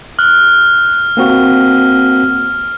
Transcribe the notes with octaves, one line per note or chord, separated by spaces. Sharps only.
F6 F#6
A#3 C4 F#4